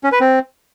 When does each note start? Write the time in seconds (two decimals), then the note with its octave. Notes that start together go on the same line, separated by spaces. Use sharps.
0.04 C#4
0.12 B4
0.20 C4